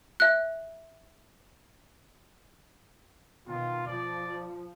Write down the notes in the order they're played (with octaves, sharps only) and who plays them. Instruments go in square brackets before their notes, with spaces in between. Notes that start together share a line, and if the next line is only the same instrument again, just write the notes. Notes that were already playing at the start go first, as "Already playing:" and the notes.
[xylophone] E5 F#6
[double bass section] B2 D#3 [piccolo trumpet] F4
[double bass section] F3 [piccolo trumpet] D5